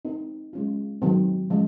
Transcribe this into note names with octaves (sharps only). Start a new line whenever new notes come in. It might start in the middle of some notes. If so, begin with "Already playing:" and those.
C4 D#4 A#4
G#3 C#4 F4
D#3 F#3 C4
F3 G#3 C#4